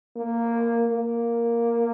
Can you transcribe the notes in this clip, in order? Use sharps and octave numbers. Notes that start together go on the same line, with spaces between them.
A#3
A#3